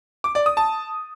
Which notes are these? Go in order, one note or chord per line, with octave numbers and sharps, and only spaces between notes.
D6
D5
D#6
A5